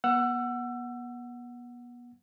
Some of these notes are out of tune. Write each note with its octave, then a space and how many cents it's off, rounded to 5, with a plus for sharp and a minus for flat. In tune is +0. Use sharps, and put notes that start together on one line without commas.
B3 -35 F#5 +0 E6 +25